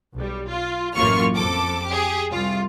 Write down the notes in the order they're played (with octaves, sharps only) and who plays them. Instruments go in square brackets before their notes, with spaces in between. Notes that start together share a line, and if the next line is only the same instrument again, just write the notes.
[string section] B1 G3
F4
A1 F#2 A#3 F4 C#6 F6
F2 A4 D6
G4 G#4
C2 F4